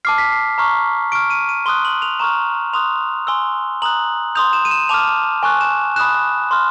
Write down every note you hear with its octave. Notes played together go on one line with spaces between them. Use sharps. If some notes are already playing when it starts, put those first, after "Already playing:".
A5 D6 F6 C7
B6
C7
A#5 C#6 F6
C#6 F6 D7
D#7
D#7
C6 D#6 F#6 G7
F#7
F7
A#5 C#6 F6 E7
C6 D#6 F#6 F7
G#5 C6 E6 G7
A#5 D#6 F#6 F#7
C6 D#6 G6 F7
E7
D#7
E7
A5 D6 F6 F7
G#5 C#6 F#6
E7
B5 D#6 F#6 E7
C6 F6